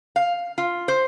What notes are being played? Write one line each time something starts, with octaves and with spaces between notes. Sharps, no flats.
F5
F4
C5